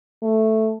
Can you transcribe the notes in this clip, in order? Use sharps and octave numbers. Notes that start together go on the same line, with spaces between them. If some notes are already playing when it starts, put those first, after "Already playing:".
A3